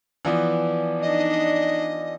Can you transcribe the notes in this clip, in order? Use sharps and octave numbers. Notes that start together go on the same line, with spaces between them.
E3 F3 B3 D5 G#5 D6
D4 D#4 D#5